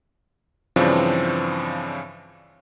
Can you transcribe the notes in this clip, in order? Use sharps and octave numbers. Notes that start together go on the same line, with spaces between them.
G2 C#3 E3 F3 C4 D4